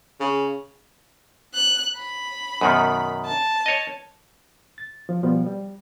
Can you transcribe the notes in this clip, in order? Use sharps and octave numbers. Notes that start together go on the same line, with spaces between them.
C#3
F#6
B5
F#2 B2 D#3
A5
C#5 D#5
A6
F3
B2 F3 G3 B3
G3